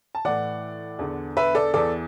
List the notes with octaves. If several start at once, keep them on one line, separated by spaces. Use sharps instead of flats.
A5
A2 E3 D5 F#5
E2 D3
B4 E5
A4 D5
E2 E3 A4 D5